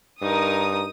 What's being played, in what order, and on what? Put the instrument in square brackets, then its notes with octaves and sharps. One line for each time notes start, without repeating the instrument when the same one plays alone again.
[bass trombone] G2 [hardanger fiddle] D#4 A#4 [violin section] D#6